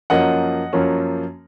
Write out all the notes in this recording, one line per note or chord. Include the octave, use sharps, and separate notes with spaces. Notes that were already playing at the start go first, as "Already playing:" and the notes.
F#2 F3 A#3 C#4 D#5 F#5
F#2 F3 A#3 C#4